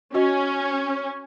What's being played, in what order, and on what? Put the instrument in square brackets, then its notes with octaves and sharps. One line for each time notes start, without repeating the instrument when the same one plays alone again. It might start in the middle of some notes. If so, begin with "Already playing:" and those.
[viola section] C#4 [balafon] F#4 D#5